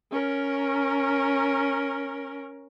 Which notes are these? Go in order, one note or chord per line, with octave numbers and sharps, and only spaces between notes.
C#4 A#4